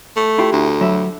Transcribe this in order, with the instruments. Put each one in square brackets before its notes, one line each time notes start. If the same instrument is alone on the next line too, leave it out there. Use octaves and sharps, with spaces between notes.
[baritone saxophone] A3
[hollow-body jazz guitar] E4 F4 G4
[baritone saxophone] D2
[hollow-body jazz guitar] F#3 E5 B5